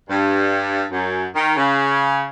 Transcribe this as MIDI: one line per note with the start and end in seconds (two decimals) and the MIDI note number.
0.09 0.84 43
0.91 1.25 42
1.34 1.54 51
1.56 2.27 49